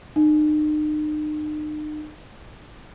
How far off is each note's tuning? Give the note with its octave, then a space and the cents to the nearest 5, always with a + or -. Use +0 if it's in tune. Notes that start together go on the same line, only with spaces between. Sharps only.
D#4 -40